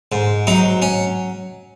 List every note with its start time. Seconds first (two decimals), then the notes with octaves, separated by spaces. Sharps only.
0.12 G#2
0.47 F#3 D#4
0.82 C#4